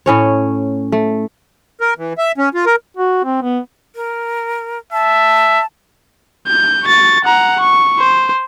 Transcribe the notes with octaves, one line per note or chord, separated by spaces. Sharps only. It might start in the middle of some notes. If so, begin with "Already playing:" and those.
A2 C#4 C#5
A3
A#4
E3
E5
C#4
F4
A#4
F#4
C4
B3
A#4
E5 A5
G6
C#6 A6
F#5 A#5
C#6
C5